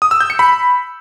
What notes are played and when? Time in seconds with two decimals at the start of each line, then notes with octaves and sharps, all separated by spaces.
0.02 D#6
0.11 E6
0.20 G6
0.30 C#7
0.39 B5